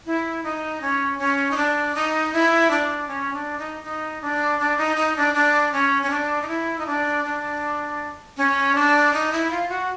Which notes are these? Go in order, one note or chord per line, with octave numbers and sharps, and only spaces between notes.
E4
D#4
C#4
C#4
D#4
D4
D#4
E4
D4
C#4
D4
D#4
D#4
D4
D4
D#4
D#4
D4
D4
C#4
C#4
D4
D#4
E4
D#4
D4
D4
C#4
D4
D#4
E4
F4
F#4